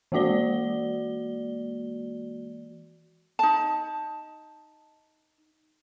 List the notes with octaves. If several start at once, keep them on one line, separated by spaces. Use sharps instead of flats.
E3 G#3 A#3 F#4 D5 G7
D#4 A5